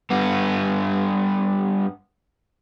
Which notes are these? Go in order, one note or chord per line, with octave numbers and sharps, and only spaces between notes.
G2 B3